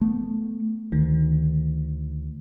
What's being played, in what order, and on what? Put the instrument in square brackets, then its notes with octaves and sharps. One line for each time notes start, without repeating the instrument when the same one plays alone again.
[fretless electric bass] A3 B3
[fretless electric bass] D2 [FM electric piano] D#3